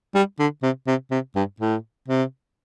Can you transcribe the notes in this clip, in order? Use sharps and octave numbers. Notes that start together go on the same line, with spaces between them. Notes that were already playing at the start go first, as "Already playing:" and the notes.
G3
D3
C3
C3
C3
G2
A2
C3